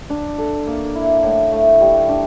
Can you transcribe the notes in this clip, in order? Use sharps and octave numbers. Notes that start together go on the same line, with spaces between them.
D4
A4
A#3
E4
A2
A3
G3
D4